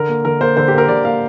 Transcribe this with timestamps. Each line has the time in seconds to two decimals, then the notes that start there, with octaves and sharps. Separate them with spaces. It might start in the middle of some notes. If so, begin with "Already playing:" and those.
Already playing: D3 A#4
0.09 A#3
0.25 D3 A#4
0.41 A#3 C5
0.57 D3 C5
0.68 G4
0.73 A#3 A#4
0.88 D3 D5
1.05 A#3 F5